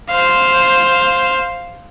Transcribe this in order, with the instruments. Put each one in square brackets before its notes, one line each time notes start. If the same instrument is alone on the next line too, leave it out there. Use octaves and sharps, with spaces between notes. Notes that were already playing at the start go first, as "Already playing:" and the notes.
[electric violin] C5 F5